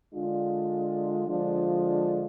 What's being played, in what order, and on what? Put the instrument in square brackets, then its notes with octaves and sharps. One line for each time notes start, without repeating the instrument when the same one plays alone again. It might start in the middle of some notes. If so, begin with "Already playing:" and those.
[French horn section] D3 G#3 D4 F4
D3 F3 G#3 D4 F4